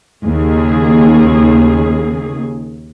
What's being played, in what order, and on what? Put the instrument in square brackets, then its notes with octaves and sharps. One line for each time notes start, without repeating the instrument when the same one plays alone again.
[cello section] D#2 C#3 G#4